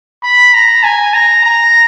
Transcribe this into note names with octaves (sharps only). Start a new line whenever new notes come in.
B5
A#5
G#5
A#5
A#5